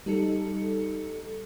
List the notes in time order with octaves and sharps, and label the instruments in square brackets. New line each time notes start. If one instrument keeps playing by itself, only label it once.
[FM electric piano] G3 D#4 A4 C#7